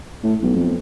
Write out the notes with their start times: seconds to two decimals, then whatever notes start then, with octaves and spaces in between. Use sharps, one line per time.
0.23 A2
0.43 B1
0.56 F2